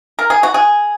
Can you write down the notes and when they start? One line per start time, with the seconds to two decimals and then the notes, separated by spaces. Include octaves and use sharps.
0.19 A#4
0.30 G#4
0.43 F#4
0.54 G#4